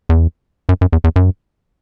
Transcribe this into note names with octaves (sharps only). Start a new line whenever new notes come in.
E2
F#2
F#2
E2
E2
F#2